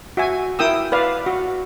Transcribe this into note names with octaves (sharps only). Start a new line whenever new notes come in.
F#4 E5 G#5
E4 A#4 G5 D#6 E6
B4 D5 F5
F#4